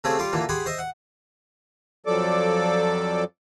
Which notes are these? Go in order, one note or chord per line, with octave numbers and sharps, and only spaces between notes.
C#3 A3 C4 G4 G#4
G3 F4 C6 D6
A#2 D3 E3 A#3
G4 G#4 F#5 B5 C6
C5 D#5 E5
F#5
F2 F3 F#3 A4 D5 D6